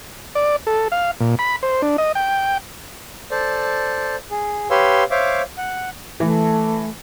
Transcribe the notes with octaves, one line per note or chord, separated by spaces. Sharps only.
D5
A4
F5
A#2
B5
C5
D4
D#5
G5
A4 C5 D5
G#4
G4 B4 C#5 F5 C6 E6
C5 C#5 E5 F5 D6
F#5
E3 A3